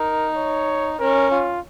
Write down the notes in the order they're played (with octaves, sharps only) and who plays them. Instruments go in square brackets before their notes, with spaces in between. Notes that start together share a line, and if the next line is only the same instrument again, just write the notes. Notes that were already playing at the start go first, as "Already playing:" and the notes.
Already playing: [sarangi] D#4 [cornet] A#4
[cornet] C#5
[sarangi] C#4 [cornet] A#4
[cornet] F4